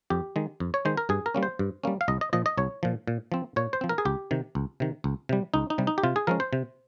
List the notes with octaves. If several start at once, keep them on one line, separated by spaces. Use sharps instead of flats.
F2 G4
D#3 G#3
F2
C#5
D#3 G#3 C5
A#4
G2 G#4
A#4
G3 A#3 C#4
C5
G2
G3 A#3 C#4
F5
C2 D#5
D#5
A#2 F3 D#5
D#5
C2 C#5
A#2 F3
A#2
F3 C4
A#2 C#5
C5
F3 C4
A#4
G#4
C#2 G4
C3 D#3
C#2
C3 D#3
C#2
C3 G3
C#2 D#4
D#4
C3 G3
D#4
G4
C3 F4
G#4
F3 G#3 C#4 A#4
C5
C3